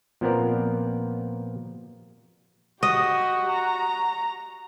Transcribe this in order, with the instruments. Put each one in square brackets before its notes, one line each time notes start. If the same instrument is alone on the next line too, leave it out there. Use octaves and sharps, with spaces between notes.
[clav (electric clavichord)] A#2 F3 B3 C4 A#4 D5
[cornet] F#4 [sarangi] G4 [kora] D#5
[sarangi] A#5